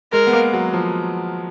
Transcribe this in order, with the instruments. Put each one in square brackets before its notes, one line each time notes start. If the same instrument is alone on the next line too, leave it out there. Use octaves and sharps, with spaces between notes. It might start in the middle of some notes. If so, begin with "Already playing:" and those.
[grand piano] G#3 [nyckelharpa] A#4
[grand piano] B3
A#3
F#3
F3